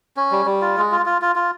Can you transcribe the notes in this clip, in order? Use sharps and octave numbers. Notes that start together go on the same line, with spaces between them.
C#4
G3
G3
F4
G#3
F4
F4
F4
F4